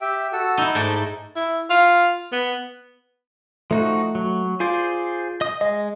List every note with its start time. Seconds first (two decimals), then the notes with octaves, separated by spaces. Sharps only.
0.01 G4 E5 G5
0.33 F#4 A4 E6
0.58 D#4 E4
0.75 G#2 A3 D5 A5
1.36 E4
1.70 F4
2.32 B3
3.71 F3 A3 D#4 F#4
4.15 F#3
4.60 F4 G#4 C5 D5
5.41 D#5 D#6
5.61 G#3 D#5